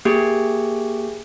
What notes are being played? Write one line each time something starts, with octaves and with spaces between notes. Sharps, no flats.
A#3 G4 G#4